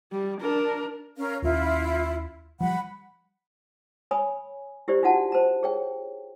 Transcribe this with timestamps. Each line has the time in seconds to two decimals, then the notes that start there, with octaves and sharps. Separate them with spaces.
0.12 G3
0.41 D4 A#4
1.17 C#4 A#4 F5
1.42 D#2 C#4 E4 F4
2.61 F3 G3 F#5 B5
4.11 C#5 G#5 B5 D#6
4.88 E4 G4 C5 D5
5.03 D4 D#4 F4 F#4 F#5 A5
5.32 C5 A5 A#5
5.63 G#4 C#5 G5